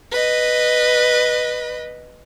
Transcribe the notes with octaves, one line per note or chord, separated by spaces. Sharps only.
B4 D#5